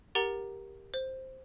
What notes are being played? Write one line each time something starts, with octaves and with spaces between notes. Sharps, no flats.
G4 A#4 F#5 A#5 A6 G7
C5